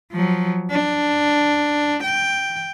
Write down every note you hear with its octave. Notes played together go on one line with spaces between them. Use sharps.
F3 F#3
D4
G5